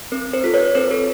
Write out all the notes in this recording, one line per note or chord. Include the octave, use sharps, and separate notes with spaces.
C4 A#4
A#4 C5
F4 A4
B4 C#5
C4 A#4 C5
A4 B4